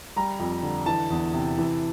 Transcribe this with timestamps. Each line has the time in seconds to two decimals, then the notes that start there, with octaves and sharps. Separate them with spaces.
0.16 G3 A#5
0.39 F2
0.63 D3
0.86 E3 A5
1.10 E2
1.34 C3
1.58 E3